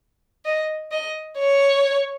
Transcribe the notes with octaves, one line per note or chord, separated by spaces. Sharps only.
D#5
D#5
C#5